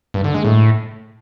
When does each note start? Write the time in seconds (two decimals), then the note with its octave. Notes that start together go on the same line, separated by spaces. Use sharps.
0.14 G2
0.24 D3
0.34 G#3
0.45 A2